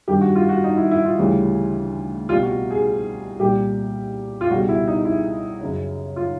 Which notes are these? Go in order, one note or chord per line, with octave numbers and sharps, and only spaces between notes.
G2 D#3 G3 G4
F#4
F4
F#4
D#4
E4
E4
F4
D2 C#3 E3 G3
C2 B2 G3 F4
F#4
G#4
C2 A#2 G3 G4
F4
C#2 B2 G3 F#4
E4
D#4
E4
F#2 C#3 F#3
F4